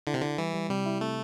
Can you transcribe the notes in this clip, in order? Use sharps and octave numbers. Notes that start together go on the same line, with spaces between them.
D3 E4
C3
D3 E4
E3 G3
G3
C3 G3
E4
C3 A3